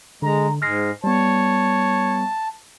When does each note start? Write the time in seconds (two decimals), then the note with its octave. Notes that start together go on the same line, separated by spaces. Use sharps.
0.22 D3 G#3 A#5
0.62 G#2 G#3 F6 A#6 C7
1.04 G3 B3 C#5 A5